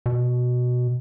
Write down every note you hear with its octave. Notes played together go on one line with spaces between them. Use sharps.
B2